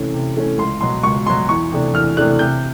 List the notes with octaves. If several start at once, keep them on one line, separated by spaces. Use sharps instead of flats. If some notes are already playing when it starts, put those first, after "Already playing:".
Already playing: C3 E3 A3 C#4
C3
E3 A3 C#4
C#2 C6
B2 F#3 C6
C#2 C#6
B2 F#3 C6
E2 C#6
C3 E3 A3 D4
E2 F6
C3 E3 A3 D4 F#6
C3 G6